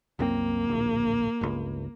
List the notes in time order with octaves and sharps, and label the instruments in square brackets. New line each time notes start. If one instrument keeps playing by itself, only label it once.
[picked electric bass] C2 F#2 C4 [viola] A#3
[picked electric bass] D1 A#1
G1 C#2